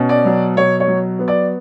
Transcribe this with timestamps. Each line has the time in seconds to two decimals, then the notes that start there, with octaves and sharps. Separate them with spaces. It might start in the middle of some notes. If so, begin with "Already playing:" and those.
Already playing: B2 C#4
0.09 D5
0.25 F#3
0.56 B2 C#5
0.80 C#5
0.88 F#3
1.19 B3
1.28 D5